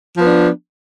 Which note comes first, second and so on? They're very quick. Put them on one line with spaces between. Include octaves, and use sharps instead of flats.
F3 B3 D4